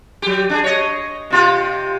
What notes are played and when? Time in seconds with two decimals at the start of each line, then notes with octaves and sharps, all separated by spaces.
0.22 F#3 G4
0.50 D4 D#4 G#4
0.64 C#5 D#5
1.30 C3 F4 G4